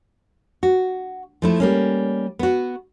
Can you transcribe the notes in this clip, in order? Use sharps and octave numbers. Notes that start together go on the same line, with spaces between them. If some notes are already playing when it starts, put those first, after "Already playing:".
F#4
F3 A3 E4
G3 A#3 C#4
B3 F#4